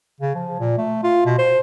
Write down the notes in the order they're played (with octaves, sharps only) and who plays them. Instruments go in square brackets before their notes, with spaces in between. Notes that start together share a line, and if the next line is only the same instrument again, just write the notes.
[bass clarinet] C#3
F3
A#2
A3
F4
B2
C5